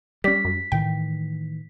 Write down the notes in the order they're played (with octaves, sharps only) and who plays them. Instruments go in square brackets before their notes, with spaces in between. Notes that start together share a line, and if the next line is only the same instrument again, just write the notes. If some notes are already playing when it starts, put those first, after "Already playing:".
[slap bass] G3 C#4 [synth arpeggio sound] G4 D5 [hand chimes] B6
[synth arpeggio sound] F#2
[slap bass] A2 D#3 E3 [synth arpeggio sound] G5